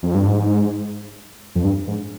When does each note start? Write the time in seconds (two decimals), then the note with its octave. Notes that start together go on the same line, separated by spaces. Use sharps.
0.03 F2
0.15 G2
0.27 G#2
1.55 F2
1.64 G2
1.87 G#2